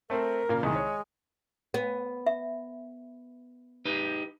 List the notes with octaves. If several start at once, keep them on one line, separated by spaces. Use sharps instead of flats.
A3 C4 A#4 C5
A#2 C#3 A#3
C2 D#3 G#3
C#5
B3
E5
D#4 G4 B4